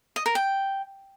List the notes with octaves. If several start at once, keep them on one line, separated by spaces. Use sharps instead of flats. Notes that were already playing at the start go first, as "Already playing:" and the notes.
D#5
A#4
G5